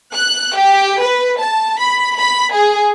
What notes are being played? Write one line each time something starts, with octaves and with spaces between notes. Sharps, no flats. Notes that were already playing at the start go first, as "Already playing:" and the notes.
F#6
G4
B4
A5
B5
B5
G#4